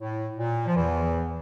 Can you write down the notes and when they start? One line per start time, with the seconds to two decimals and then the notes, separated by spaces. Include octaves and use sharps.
0.01 A2
0.38 A#2
0.66 F3
0.76 E2 E3